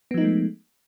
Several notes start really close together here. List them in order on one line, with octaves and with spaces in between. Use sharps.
B3 F3 D#4 A3 G#3